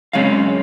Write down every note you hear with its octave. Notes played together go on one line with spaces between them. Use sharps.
F#2 C#3 G#3 C4 C#5 F5